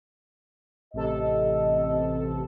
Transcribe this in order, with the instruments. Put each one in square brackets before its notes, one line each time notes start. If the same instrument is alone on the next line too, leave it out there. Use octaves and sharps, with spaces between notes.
[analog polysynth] A1 C3 A4 [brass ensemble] D#5